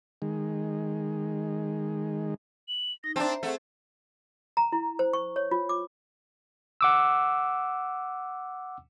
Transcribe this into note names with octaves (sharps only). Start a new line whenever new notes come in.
D#3 G#3
F#7
D#4 A#6
C4 D4 C5 E5 A5 A#5
A3 C4 G#4 C5 F#5
A#5
E4
C5
C#6
C#5
F4
D6
F#5 D6 E6